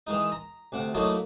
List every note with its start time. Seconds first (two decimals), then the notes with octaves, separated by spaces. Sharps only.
0.07 D#3 E3 G#3 D#4
0.32 A#5
0.72 D2 C3 F#5
0.94 F#3 A3 A#3 D#4 E4 C#5